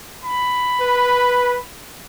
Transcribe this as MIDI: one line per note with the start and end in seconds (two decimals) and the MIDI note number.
0.24 1.63 83
0.81 1.58 71